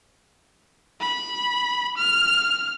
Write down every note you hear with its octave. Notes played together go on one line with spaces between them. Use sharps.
B5
F6